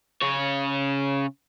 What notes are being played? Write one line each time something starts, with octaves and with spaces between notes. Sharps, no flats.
C#3 C#5